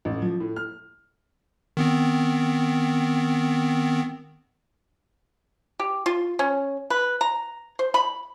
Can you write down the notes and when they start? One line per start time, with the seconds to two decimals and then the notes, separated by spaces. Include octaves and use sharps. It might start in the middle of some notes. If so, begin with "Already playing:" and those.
0.05 A1
0.22 F3
0.40 A2
0.56 F6
1.77 D#3 B3 C4
5.79 G4
6.06 F4
6.39 C#4
6.90 B4
7.21 A#5
7.79 C5
7.94 B5